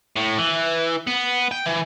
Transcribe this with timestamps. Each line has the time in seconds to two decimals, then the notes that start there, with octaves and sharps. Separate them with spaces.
0.16 A2
0.38 E3
1.07 B3
1.51 G5
1.66 E3